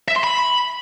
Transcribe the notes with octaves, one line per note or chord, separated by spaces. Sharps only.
E5
C6
B5